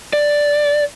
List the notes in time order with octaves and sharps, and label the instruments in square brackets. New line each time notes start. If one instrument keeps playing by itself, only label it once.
[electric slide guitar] D5